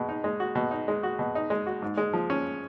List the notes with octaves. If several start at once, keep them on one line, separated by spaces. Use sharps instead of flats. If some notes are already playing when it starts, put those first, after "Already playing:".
Already playing: B2 G#3
D#4
G#3
F#4
B2
D#4
G#3
F#4
B2
D#4
G#3
F#4
G#2
G#3
F3
C#4